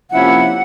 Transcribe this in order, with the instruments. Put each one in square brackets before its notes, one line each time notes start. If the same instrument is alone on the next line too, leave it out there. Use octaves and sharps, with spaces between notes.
[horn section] C3 F3 A#3 C#4 E4 [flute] F#5